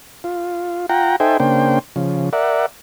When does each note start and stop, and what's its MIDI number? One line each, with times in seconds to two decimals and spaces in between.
0.24 0.86 65
0.89 1.16 65
0.89 1.16 78
0.89 1.16 79
0.89 1.16 82
1.20 1.37 63
1.20 1.37 69
1.20 1.37 72
1.20 1.37 76
1.20 1.37 79
1.20 1.37 80
1.40 1.79 49
1.40 1.79 58
1.40 1.79 62
1.40 1.79 72
1.40 1.79 79
1.96 2.30 49
1.96 2.30 53
2.33 2.66 70
2.33 2.66 74
2.33 2.66 76
2.33 2.66 78